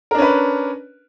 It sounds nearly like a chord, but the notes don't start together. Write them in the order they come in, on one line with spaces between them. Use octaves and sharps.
A#4 D4 C#4 B4